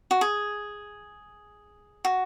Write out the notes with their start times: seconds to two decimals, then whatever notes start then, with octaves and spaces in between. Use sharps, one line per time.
0.11 F#4
0.21 G#4
2.05 F#4